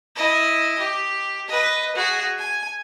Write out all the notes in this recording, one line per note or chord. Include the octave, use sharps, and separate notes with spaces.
E4 D#5
G4
B4 D#5
F#4 G#4
G#5